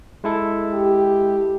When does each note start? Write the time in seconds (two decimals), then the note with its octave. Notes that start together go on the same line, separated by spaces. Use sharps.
0.24 G#3 E4 A4
0.73 G4